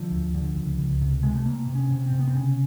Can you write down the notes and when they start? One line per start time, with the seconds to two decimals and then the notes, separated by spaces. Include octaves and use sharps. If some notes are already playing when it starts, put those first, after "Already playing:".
Already playing: D3 F3
0.11 D2
0.34 D3
0.56 C#2
0.78 C#2
1.01 C3
1.23 C3 G#3
1.35 A3
1.45 C3 A#3
1.68 C3
1.75 C#4
1.91 C3
2.06 C4
2.13 C3
2.19 B3
2.28 C4
2.35 C#3 C#4